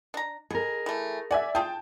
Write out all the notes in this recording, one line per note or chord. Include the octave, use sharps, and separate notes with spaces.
D4 A#5
B2 G#4 A#4
E3 A3
D5 E5 F#5 G#5
F4 G#4 G5 A5